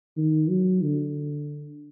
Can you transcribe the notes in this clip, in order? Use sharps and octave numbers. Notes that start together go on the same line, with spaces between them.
D#3
F#3
D3